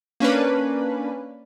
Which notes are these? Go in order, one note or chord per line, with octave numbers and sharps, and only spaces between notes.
A#3 C#4 D4 B4